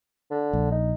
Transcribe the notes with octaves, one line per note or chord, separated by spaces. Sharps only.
D3
A#1
D#4